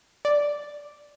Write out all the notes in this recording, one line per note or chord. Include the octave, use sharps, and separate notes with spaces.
D5